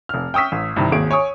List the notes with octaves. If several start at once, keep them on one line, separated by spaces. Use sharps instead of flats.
F1 F6
G5 C#6 D#6 E6 B6
A1
G2 C3 D#3 E3
G#1 D#2 G#4 D7
C#5 G#5 C#6 D#6